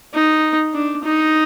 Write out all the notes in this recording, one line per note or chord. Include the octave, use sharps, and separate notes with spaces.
D#4
D4
D#4